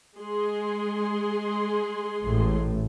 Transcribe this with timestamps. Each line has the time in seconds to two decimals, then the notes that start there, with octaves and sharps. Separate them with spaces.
0.18 G#3 G#4 C6
2.23 A1 A2